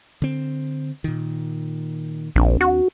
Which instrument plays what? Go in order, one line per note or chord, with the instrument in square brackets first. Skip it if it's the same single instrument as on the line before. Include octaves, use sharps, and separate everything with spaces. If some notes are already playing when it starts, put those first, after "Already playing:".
[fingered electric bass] D3 C4
A#2 D#3
[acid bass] A#1 [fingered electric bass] D#2 C4 D4
[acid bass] F#4